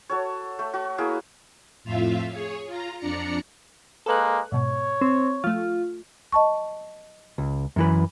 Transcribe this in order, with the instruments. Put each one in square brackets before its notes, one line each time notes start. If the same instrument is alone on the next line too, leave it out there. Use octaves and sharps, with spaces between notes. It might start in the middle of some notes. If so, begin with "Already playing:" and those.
[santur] F#4 A4 C#5
A3
F#4
A#3 E4 G#4
[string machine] F2 A2 F4 E5 F5
G#4 C#5
F4 A#5
F2 D4 D5 A#5 C#7
[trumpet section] G#3 A#3 [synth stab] A4 B4 F#6
[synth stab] G#2 B2 [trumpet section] C#5
[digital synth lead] C4
[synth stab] F3 A3 [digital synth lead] F4
[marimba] D#5 A5 C#6
[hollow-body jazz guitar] C#2
F#2 E3 B4